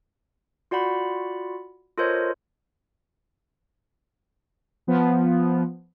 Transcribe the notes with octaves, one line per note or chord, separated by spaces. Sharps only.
F4 F#4 D5 F#5 B5
F4 A4 A#4 C5 C#5 D#5
F3 B3